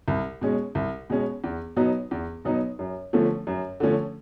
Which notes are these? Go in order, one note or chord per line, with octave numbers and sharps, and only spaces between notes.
C2
B2 G#3 C#4
C2
B2 G#3 C#4
E2
B2 F#3 B3 D#4
E2
B2 F#3 B3 D#4
F#2
D3 F3 A3 C#4
F#2
D3 F3 A3 C#4